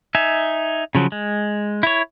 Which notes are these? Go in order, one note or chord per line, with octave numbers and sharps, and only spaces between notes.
D#4 E5 G#5
C#3 F3 F#3
G#3
E4 C#5